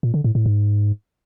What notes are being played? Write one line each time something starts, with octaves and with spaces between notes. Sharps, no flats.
A#2
D3
A2
A2
G#2